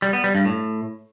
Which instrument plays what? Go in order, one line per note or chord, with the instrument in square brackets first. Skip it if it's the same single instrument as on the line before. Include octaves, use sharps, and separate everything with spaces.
[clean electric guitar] G3
B3
G3
G2
A2